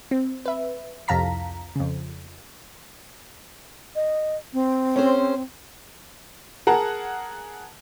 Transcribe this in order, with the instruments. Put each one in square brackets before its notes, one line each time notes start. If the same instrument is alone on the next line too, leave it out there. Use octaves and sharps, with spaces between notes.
[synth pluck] C4
B4 E5
C2 F2 F5 A5 A#5 B6
F2 C#3
[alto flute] D#5
C4
[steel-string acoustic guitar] C#4 G#4 C5
[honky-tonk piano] G#4 A#4 F#5 A5 A#5